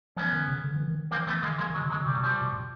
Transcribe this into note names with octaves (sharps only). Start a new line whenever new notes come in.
F3 B3 C#4
D#3
C#3
D3
E3
D#3
E3 A#3 C4
E3 A3 B3
D#3 G#3 A#3
E3 G#3 A#3
D#3
F#3 G#3
C#3
F#3 G#3
D3
C3 G3
F#3
C3
F3 G3
B2
A#2